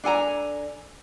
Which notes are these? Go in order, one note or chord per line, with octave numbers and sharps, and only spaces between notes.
D4 A4 G#5 A#5